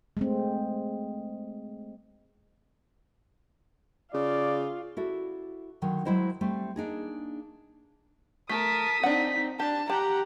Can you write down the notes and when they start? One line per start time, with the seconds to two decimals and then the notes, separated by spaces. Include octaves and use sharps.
0.17 G#3 A3 C4
4.14 C#3 F4 D5
4.97 E4 F#4 A4
5.82 D3 D#3 F#3
6.05 F#3 G#3 E4 C5 D#5
6.41 G3 A3 C4 C5
6.76 A#3 D4 D#4 G#4
8.49 A3 A#4 A5 D#6 B6
9.03 C4 D4 D#4 F#5
9.60 D4 G4 A5
9.89 G4 F#5 A5 A#5